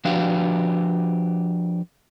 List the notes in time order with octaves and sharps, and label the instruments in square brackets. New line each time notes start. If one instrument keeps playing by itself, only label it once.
[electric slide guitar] F3 D4 F#4 G4 B4 F5